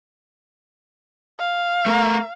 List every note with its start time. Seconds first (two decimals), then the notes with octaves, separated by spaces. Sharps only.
1.39 F5
1.86 A3 A#4